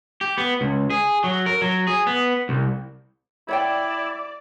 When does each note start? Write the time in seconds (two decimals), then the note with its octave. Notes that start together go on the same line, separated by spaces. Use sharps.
0.21 G4
0.38 B3
0.61 C#2
0.90 G#4
1.24 F#3
1.46 A#4
1.62 F#3
1.87 G#4
2.07 B3
2.49 C2
3.49 E4 C#5 D5 F#5 G5